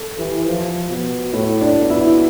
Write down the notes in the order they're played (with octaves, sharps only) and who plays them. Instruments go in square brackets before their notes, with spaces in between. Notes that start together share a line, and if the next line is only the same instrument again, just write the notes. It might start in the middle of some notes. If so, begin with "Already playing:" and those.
Already playing: [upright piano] A4
[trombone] E3 [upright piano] G4
[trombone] F3
B2
[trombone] A2 [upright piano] E4
[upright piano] D4
[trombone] B2
[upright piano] E4